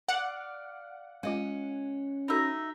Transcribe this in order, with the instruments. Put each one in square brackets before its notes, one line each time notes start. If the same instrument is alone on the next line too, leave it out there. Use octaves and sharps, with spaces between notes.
[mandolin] D5 F5 [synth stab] F#5
[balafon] G#3 F4 [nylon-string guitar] C#4 D#5
[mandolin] D#4 E5 [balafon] F#4 A4 B5